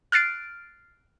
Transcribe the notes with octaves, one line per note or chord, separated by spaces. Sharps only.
F6 F#6 A6 C7 D7